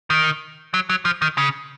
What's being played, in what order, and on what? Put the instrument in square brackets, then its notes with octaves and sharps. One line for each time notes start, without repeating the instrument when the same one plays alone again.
[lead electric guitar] D#3
F#3
F#3
F3
D#3
C#3